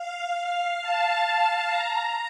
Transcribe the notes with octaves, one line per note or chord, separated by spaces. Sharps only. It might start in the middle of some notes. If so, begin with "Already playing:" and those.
Already playing: F5
F5
A5
A#5